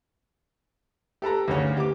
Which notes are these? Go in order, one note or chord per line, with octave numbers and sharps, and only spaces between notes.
G4 A4 B4 A#5
D2 C#3 C#4
G4 D6